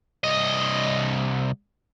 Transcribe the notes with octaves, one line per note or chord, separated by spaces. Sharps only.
C2 D#5